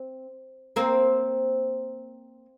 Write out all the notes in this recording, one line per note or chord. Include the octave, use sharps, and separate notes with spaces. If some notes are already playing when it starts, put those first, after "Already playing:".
Already playing: C4
A#3 C4